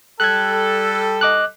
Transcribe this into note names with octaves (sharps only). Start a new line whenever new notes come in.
G3 A4 F#6 G#6
D#5 D6 F#6